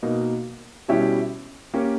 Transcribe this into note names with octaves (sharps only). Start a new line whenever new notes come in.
B2 A#3 D#4
B2 G3 C#4 E4 G4
A#3 C#4 G4